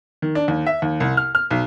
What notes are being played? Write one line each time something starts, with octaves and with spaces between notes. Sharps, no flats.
D#3
D4
D#2
E5
D#2
C2
F6
F6
B1